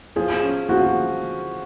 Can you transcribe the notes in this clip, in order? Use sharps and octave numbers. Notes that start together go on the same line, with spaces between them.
F3 G#4
C#4
F3 F#4